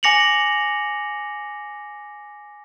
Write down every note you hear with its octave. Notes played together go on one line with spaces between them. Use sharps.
G#5 D6 A#6 C#7 F7 F#7